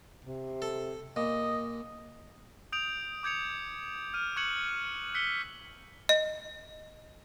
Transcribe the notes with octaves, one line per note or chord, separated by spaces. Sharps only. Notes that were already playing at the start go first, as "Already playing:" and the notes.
C3
A4
A#2 D#5
D#6 G6 D7 F7
D6 G6 G#6 C#7 F7
F6 D#7
C#6 F#6 G#6 C#7 F#7
C#7
E6 F#6 B6 C#7 G7
D#5